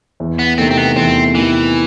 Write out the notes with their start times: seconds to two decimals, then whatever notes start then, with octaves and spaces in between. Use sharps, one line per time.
0.20 E2
0.39 B3
0.58 C3 D#3 A3 C4
0.71 C4
0.77 B3
0.96 E2 C4
1.35 C3 D#3 E3 A3